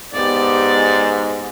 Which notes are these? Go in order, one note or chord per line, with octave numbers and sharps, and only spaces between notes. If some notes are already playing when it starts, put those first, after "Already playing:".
G#2 B3 G4 D5